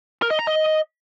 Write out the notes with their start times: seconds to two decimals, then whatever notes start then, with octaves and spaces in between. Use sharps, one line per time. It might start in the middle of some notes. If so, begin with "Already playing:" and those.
0.22 A#4
0.31 D#5
0.39 A#5
0.47 D#5